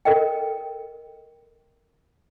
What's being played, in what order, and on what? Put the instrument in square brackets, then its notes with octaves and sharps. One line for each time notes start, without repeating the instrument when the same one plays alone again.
[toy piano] A4 A#4 D#5 G5